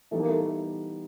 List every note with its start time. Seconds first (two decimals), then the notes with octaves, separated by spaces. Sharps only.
0.11 E3 G3 A3 B3 D#4
0.20 A#3
0.30 A3